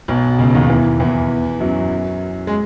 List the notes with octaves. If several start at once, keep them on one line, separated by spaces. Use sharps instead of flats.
B1 B2
C#2 C#3
D#2 D#3
E2 E3
E2 E3
F#2 F#3
G#3